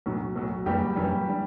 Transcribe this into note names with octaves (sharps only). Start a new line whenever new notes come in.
B1 A2 F#3
B1 A2 F#3
F#1 F#2 E3 G3 G4
F#1 F#2 E3 G3
D3 G3